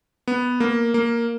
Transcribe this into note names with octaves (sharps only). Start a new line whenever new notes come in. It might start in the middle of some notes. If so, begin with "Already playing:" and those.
B3
A#3
A#3